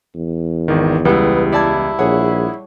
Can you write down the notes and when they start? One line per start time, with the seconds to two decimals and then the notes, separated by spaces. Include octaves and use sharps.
0.15 E2
0.68 G#1 D#3
1.05 C#2 G3 B3 E4
1.52 E4 D5 A5 G#6
1.99 A#1 G#4 C#5 F#5